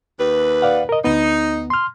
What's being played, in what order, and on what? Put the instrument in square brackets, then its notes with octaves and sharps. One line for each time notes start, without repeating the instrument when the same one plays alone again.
[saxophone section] D#2 B4
[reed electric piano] D5 F5 F#5
A#4 D#5
[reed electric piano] D2 B3 [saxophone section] D#4
[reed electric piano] C6 F6